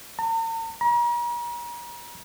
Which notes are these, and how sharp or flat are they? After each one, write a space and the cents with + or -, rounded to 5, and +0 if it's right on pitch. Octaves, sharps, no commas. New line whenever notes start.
A#5 -45
A#5 +40